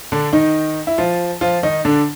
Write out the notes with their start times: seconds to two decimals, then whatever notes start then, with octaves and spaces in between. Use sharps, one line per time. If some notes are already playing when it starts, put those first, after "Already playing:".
0.12 D3 D4
0.33 D#3 D#4
0.87 E4
0.98 F3 F4
1.41 F3 F4
1.63 D#3 D#4
1.85 D3 D4